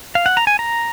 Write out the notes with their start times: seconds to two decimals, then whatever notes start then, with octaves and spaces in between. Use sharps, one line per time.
0.15 F5
0.26 F#5
0.37 A#5
0.47 G#5
0.59 A#5